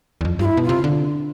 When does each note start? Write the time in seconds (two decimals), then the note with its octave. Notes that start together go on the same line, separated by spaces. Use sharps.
0.21 E2
0.25 F2
0.39 G2 F4
0.45 E4
0.57 B2
0.64 C3 F4
0.84 D3